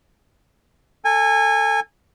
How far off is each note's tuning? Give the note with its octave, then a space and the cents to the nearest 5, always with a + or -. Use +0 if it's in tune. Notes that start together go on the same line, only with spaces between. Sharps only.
A4 +15 G#5 -20